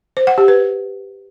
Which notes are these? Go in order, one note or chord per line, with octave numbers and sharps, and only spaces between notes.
C5
F#5
G4
B4